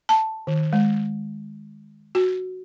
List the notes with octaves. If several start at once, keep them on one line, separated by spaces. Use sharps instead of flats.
A5
D#3
G#3
F#4